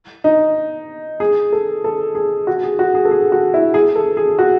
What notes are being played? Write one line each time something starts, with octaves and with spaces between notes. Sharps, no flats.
D#4
G#4
A4
A4
G#4
F#4
G#4
F#4
G#4
A4
G#4
F#4
E4
G#4
A4
G#4
F#4